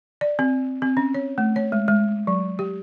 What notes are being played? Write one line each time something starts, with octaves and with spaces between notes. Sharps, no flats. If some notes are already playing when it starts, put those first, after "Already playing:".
D5
C4
C4
C#4
C#5
A3
C#5
G#3
G#3
F#3
G4